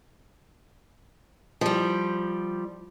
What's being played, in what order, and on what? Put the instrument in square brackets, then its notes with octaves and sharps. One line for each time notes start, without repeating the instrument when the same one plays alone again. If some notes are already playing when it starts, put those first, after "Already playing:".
[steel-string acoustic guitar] F3 G3